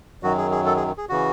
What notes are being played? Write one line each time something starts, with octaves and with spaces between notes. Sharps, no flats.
F#2 D#3 F#3 F#4
G#4
G#4
A4
G#4
G#4
C#3 E3 F#4